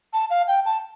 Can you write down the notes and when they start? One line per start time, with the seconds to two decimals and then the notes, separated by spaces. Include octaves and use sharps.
0.13 A5
0.30 F5
0.48 G5
0.65 A5